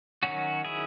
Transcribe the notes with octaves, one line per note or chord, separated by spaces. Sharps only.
D#3 F#3 C#4 F#4
E4 G#4